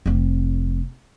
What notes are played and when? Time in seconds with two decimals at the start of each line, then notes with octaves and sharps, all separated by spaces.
0.06 F1 C4